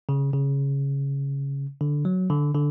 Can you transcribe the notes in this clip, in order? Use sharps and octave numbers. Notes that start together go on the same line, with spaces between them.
C#3
C#3
D3
F#3
D3
D3